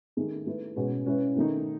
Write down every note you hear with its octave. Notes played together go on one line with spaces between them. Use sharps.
D#3 A3 D#4 G#4
A3 E4 B4
B2 G#3 C#4 G#4 B4
G#3 C#4 E4 B4
D#3 A3 D#4